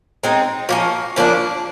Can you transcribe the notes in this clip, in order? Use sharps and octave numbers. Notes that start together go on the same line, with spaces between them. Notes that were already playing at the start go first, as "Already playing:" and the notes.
G#3 C4 D#4
F3 A#3 C#4
C#3 F3 A#3 D4